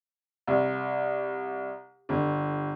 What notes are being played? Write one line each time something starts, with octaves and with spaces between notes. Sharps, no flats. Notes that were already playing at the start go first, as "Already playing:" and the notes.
C2
G1